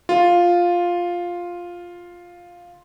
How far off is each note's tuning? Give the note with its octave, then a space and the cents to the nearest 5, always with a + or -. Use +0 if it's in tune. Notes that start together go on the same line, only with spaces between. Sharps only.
F4 +5